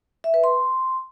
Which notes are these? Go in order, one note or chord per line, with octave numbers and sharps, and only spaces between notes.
E5
B4
C6